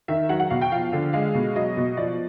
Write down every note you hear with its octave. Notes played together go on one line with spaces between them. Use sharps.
D#3 E5
F#3 F#5
F#5
B2 F5
G5
F3 F5
D3
G#3 F5
B2
F#3 D#5
B2
F3 D5